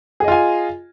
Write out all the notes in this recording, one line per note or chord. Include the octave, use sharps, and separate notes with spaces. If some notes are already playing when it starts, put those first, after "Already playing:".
F4 G#4 D#5 G#5